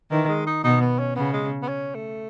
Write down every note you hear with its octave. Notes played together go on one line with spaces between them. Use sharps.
D#3 E3
G#3
D#4
B2 D#4
B3
C#4
C#3 B3
G#3
B3
C#4
A3